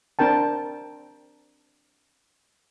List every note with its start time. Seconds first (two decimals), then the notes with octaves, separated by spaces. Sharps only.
0.19 C4 D4 A#4 G5 A5